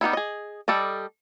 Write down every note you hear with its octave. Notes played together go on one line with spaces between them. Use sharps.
G3 B3 D#4 E4
G#4 D#5
G3 A4 D5 D#5